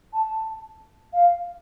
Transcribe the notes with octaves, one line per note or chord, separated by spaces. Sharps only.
A5
F5